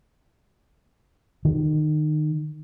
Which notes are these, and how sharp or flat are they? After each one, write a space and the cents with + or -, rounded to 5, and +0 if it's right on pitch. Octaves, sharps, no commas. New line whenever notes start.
D#3 -30